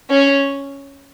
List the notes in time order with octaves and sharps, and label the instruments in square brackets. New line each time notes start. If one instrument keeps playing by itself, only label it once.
[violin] C#4